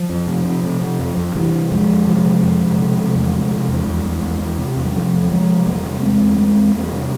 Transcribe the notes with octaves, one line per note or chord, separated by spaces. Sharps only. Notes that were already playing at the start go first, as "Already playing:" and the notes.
Already playing: F3
F2
C3
C3
C3
C3
F2
F2
C3 E3 G3
C3
F2 F3 G#3
F2
C3 F3 G#3
C3
F2
C3
C3
C3
E2
C3
C3
E2
E2
E2
E2
E2
C3
E2
G3
C3 F3
E2
C3 F3 G#3
C3
E2 G3 A#3
C3
E2 G#3 C4
E2
E2 G#3 C4
E2
E2 G3 A#3
C3